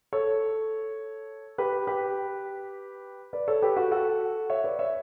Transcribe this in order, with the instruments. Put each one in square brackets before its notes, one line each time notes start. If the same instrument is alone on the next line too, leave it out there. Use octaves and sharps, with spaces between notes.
[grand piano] A4 C#5
G4 B4
G4 B4
B4 D5
A4 C#5
G4 B4
F#4 A4
F#4 A4
C#5 E5
B4 D5
C#5 E5